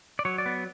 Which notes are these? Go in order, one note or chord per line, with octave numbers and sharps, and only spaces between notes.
D5
F#3 C#5
D5
B3